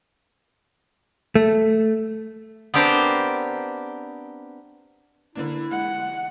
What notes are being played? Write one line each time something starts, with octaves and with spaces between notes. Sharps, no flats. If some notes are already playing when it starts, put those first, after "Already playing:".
A3
B3 C4 D4 G4 A#4 C5
D3 A#3 D4 E4
G#3 F#5